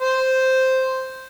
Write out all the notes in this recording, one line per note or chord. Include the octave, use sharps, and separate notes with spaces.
C5